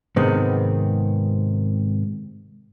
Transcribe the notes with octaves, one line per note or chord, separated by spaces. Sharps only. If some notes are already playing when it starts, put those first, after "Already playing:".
G#2 C3 D#3 B3 C4